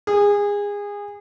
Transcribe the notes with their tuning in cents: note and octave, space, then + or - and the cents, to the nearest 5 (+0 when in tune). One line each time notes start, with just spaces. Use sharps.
G#4 -25